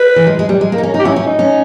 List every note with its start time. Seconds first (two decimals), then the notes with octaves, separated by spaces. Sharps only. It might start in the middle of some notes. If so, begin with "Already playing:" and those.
Already playing: B4
0.16 E3
0.27 G#3
0.39 G#3
0.49 G3
0.61 G#3
0.72 A#3
0.78 D#4
0.83 C#4
0.94 D#4
0.99 G4
1.05 C#4 E4
1.16 C#4
1.27 D#4
1.39 C#4